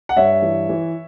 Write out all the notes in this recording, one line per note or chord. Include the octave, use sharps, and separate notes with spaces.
F#5
G2 C#5 E5
E3
E3